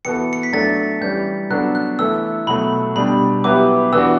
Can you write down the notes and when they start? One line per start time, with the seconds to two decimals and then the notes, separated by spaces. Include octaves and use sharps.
0.05 E3 B3 F#4 A4 C#7
0.33 C#7
0.43 B6
0.53 F#3 A3 D4 A4 A6
1.01 E3 G3 C#4 G6
1.50 F#3 B3 D4 F#4 A4 F#6
1.75 F#6
1.99 E3 A3 E4 A4 E6
2.47 B2 F#3 A3 B5
2.96 B2 G3 D4 G4 B5
3.44 F#3 B3 E4 G4 B4 D6
3.92 E3 B3 D4 F#4 E6